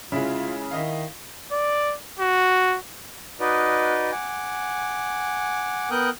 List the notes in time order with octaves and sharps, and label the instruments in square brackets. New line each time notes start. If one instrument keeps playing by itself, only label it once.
[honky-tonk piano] C#3 [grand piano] G#3 E4 [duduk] F4
[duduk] D#3 [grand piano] E4 D#5 F5
[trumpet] D5
F#4
[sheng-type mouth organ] D#4 F#4 B4 D5 D#5
F#5 G#5 D6
B3 A#4 G5 D#6 F#6 G6